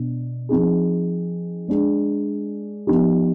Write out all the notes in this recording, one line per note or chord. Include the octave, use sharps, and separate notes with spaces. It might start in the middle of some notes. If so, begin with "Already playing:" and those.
Already playing: B2 D4
F3 C4 D#4 G#4
G#3 D4 G#4
F3 B3 D#4 G4